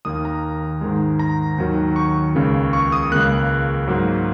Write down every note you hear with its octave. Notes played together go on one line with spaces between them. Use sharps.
D#2 D#3 A#3 D#6
A#5
G#2 D#3 G#3
A#5
D#2 D#3 F#3
C#6
C#2 C#3 A#3
C#6
D#6
C#2 C#3 A#3 F#6
G#2 F#3 A#3